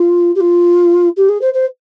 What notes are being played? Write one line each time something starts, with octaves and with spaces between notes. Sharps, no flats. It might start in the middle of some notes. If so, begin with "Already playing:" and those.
Already playing: F4
G4
F4
G4
G#4
C5
C5